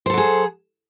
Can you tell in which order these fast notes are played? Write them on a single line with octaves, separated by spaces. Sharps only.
C5 A4 F#3 G#4